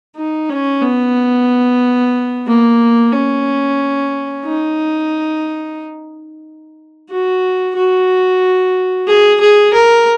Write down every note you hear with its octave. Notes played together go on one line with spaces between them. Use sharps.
D#4
C#4
B3
A#3
C#4
D#4
F#4
F#4
G#4
G#4
A#4